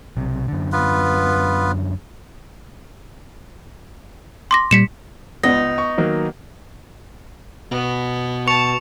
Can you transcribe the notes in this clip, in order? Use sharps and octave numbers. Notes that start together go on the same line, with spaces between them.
B1 C3
F#2 D3
B3 F4 B4
C6 D6 A#6
A#2 G3 B6 C#7 E7
C#2 B3 D#4 A#6
C#6
D#3 F#3 A#3
B2 B3
A5 C#6 C#7 F7